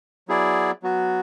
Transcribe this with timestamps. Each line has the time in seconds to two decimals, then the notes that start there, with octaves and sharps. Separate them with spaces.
0.28 F#3 B3 E4 G#4 D5
0.83 F#3 B3 F#4